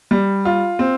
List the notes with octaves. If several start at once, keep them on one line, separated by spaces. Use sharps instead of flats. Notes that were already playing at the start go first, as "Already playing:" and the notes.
G3
F4
C4